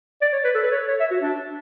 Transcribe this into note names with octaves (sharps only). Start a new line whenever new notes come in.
D5
C#5
B4
A4
B4
C#5
C#5
E5
F#4
D4